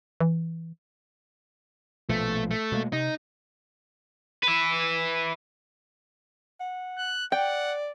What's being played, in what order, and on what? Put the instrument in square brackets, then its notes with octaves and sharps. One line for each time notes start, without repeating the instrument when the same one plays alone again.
[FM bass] E3
[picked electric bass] A#1 B2 F3 [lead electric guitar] A3
[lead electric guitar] A3
[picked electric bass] B2 G#3 A#3
[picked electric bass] C3 [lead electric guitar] D#4
[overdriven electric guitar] B4 E5
[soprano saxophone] F#5
[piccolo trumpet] F#6
[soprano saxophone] D5 [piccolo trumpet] F#5 [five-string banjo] G5